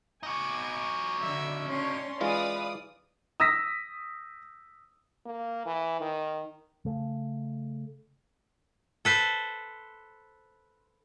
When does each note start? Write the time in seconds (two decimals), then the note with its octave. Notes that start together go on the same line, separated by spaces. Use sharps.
0.23 D#4 F#4 G#5 D6
1.19 D3 E5
1.69 C#4 D4 C#5 C6
2.21 E3 G#3 F4 B4 D5 F5 D#6
3.40 D#6 E6 A#6 B6
5.26 A#3
5.65 E3
6.01 D#3
6.85 C#3 A3
9.05 A4 B4 C5